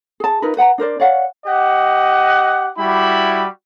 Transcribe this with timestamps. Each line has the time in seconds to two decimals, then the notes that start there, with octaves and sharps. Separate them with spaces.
0.20 G#4 A5
0.42 D#4 F4 A#4 B4
0.57 B4 F#5 G5 A#5
0.78 D4 A#4 C5 D5
1.00 C#5 D5 F5 F#5
1.46 G4 D#5 F#5
2.77 G3 E4 F#4 B5